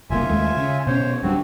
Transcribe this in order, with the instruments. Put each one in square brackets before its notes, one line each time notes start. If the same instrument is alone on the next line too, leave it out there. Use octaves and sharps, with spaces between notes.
[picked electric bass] F#1 C2 A#3 [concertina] F4 E5 G#5
[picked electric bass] D#2 G#3 A3
C#3
[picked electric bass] B2 C#4 [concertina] C5 C#5
[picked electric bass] D1 G3 D4 [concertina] C4 F#4